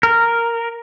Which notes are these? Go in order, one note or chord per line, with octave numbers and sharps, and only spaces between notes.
A#4